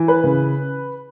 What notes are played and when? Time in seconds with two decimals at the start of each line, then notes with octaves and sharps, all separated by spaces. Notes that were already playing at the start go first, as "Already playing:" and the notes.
Already playing: E3
0.08 B4
0.24 C#3